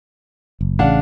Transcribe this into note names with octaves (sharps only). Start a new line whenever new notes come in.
F#1
A1 C#3 D4 F5 F#5